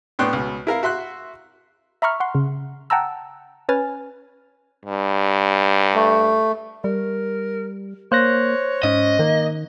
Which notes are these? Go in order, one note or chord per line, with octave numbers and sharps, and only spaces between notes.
A2 B3 D4 G5 C6 F#6
C#2 B2
E4 A#4 F5
F#4 E5 C6 F#6
E5 A#5 B5 C#6 F6
F#5 C6
C#3
F#5 G5 A5 A#5 E6
C#4 B4 G#5 F6 A6
G2
A3
G3 A#4
A#3 C5 C#5 F#6 A#6
G#2 C#4 D#5
D#3 A#3